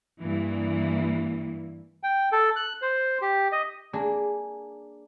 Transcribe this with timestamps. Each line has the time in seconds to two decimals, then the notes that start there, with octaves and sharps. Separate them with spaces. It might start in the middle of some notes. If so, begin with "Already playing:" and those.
0.22 G2 E3 A#3
2.03 G5
2.32 A4
2.56 F#6
2.82 C5
3.22 G4
3.52 D#5
3.93 A#3 D4 G#4 D5